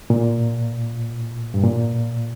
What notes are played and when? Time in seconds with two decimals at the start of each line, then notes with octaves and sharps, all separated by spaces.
0.10 A#2
1.54 G2
1.63 A#2